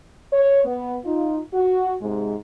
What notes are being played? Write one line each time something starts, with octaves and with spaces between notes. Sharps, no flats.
C#5
B3
D#4 F4
F#4
G#2 C3 G#3